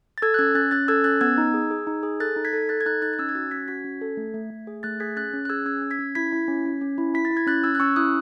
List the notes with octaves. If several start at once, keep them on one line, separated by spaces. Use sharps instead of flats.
A6
A4 E6 G#6
F#6
C#4 E6 G#6
C#4 F#6 A6
C#4 F#6 A6
A4 E6 G#6
C#4 F#6 A6
B3 E6 G#6
D#4
G#4
G#4
D#4
G#4
A4 F#6 A6
D#4
G#6 B6
A4
A4 F#6 A6
G#6
D#4 F#6 A6
D#4 F#6 A6
A6
C#4 E6 G#6
G#6
F#4 F#6 A6
C#4 G#6 B6
F#4 G#6 B6
C#4
A4
A3
A3
A3
G#4
A3 F#6 A6
G#4 G#6 B6
C#4 F#6 A6
C#4
F#6
G#4 E6 G#6
C#4 E6 G#6
C#4
G#6 B6
C#4
E4 G#6 B6
E4
C#4
C#4
C#4
E4
E4 B6
A6
E4
G#6
C#4 F#6 A6
C#4 E6 G#6
F#6
C#4 C#6 E6
E4 D#6 F#6